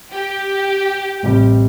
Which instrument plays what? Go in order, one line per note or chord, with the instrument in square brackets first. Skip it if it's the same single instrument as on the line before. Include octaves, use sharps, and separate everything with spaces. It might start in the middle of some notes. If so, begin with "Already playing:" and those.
[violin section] G4
[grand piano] A1 C3 G3